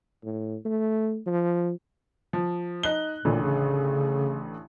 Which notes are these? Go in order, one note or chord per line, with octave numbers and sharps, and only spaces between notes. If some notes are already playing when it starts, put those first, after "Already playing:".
A2
A3
F3
F3
D#4 F#6 G7
A1 A#2 D3
C#3